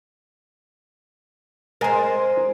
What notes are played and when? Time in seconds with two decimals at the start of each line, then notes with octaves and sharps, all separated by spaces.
1.81 G#3 C4 A#4 G#5